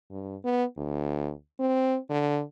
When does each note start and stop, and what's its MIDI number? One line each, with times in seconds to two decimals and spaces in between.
0.11 0.36 43
0.45 0.64 59
0.77 1.31 38
1.60 1.98 60
2.10 2.41 50